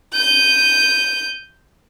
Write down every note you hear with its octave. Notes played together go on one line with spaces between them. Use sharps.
G6 D#7